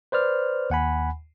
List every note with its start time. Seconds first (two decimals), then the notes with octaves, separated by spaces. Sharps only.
0.12 B4 C5 D5 F6
0.70 D#2 F#5 G#5 B5